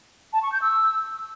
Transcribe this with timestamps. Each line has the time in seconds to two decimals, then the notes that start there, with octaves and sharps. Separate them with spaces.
0.33 A5
0.43 C#6
0.52 G6
0.62 E6